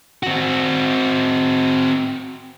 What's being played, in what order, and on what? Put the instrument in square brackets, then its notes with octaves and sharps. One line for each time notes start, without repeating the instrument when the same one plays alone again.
[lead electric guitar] C4 F#4